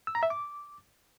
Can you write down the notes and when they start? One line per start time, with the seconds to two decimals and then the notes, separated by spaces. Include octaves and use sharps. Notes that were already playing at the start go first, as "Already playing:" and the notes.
0.07 E6
0.15 A#5
0.23 E5
0.30 D6